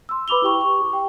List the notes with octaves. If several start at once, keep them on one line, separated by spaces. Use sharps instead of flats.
C6 E6
B4 B5 D6 F7 G7
E4 G4 G5 C#6
C#6
G4
G5